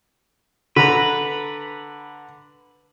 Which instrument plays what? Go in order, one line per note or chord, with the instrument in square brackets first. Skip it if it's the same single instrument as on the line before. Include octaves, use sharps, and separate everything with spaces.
[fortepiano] D3 A#5 [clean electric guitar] B4